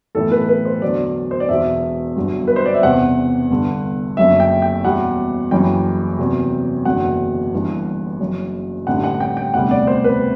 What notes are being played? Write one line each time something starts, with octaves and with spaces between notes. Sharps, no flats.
B1 A2 E3 A4
B4
B4
C5
E2 D3 F#3 D5
C5
D5
E1 E2 B2 E5
G1 G2 F#3
B4
C5
D5
E5
E1 E2 C3 F#5
G1 G2 D3
F#1 F#2 D3 E5
G5
G5
E2 B2 G3 F#5
F#1 F#2 E3 G3 G5
E2 C3 F#3
F#1 E2 D3 F#3 F#5
G1 G2 E3
F#1 F#2 F#3
A1 G2 D3 G3 F#5
F#5
G5
G5
E1 D2 C3 G3 F#5
D5
C5
B4